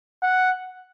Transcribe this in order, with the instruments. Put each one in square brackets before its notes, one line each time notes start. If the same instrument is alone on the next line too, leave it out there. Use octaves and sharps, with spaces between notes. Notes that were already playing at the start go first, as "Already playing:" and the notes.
[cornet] F#5